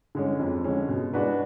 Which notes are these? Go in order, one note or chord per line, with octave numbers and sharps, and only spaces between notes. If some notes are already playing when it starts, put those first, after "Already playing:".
D3 G#3 C#4
F2
D3 G#3 C#4
B2
G#3 D4 F#4 B4